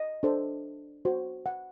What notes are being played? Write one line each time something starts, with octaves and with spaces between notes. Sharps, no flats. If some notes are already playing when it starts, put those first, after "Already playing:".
Already playing: D#5
D4 A4 C5
F#4 C5
F#5